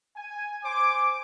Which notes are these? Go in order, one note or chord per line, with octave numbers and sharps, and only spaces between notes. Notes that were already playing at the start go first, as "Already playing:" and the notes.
G#5
C5 G#5 D6